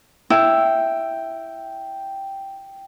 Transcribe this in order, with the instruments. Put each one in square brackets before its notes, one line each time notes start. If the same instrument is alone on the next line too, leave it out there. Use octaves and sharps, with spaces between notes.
[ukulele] E4 [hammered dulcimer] G5